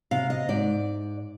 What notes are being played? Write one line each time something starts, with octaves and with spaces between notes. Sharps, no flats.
C3 F5
D#5
G#2 D5